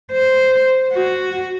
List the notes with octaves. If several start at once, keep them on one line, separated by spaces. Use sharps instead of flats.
C5
F#4